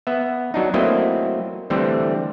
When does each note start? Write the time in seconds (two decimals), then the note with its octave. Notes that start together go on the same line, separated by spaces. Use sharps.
0.07 B3 E5
0.54 F#3 D4 D#4
0.74 F#3 A3 A#3 C4 E4 D#5
1.70 D3 E3 G3 A3 C4